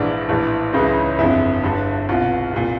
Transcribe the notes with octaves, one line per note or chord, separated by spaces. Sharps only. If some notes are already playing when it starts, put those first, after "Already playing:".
Already playing: A#1 G#2 E3 D4
A#1 A2 E3
C#2 C#3 E3 D#4
G1 F2 D3 E4
G1 G2 D3
C2 B2 F4
C2 A#2